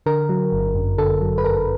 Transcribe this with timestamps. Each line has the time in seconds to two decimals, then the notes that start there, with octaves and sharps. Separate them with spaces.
0.06 D3 A#4
0.29 F#3
0.52 G1
0.75 F#2
0.98 D3 A4
1.21 F#3
1.38 B4
1.44 G1 A#4